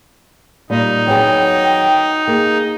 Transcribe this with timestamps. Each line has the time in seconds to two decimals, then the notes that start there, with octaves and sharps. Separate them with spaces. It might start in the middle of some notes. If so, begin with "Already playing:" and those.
0.70 A#2 G3 D#4
1.07 F#3 B3 G#4 G5
2.28 A#3 G#4